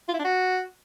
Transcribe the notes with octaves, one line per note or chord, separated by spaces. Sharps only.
F4
E4
D4
F#4